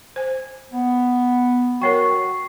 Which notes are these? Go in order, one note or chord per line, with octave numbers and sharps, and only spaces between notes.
C5 G#5
B3
F#4 A#4 C#5 G5 C#6 C7